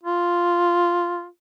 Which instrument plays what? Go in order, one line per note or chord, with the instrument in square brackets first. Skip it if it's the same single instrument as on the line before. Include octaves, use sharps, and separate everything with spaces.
[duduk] F4